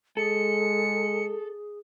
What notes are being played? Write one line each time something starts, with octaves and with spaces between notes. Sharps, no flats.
G#3 G#4 A4 C#7